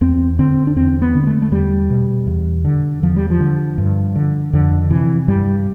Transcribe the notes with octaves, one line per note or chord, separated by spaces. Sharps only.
E2 C4
D3 C4
D4
E2 C4
B3
D3
B3
A3
A3
E2 G3
B2
E2
D3
E2 F3
G3
F3
D3
G2
D3
F2 D3
C3 E3
G2 G3